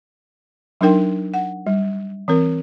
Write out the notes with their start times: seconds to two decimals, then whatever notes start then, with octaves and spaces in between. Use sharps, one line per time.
0.81 F#3 D4 D#4 A#4 G5
1.34 F#5
1.67 G3
2.28 E3 C4 A#4